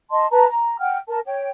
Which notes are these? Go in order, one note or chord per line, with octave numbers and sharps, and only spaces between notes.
D#5 A5 C6
B4 A5 A#5
A#5
F#5 G5 F6
A#4 A5
C#5 G5